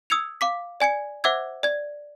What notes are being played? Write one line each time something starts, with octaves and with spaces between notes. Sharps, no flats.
D#6 E6 G#6 C#7 F7
F5 D6 B6
D5 G#5 G#6 C#7
C5 E5 F#5 D6 E6 G#6
D5 G#6